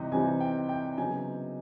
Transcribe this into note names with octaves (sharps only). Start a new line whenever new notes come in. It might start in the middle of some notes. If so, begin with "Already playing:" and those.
Already playing: C3 E3 G3 D#4
C3 E3 G3 C4 D#4 G#5
G5
G5
C#3 F#3 B3 D#4 G#5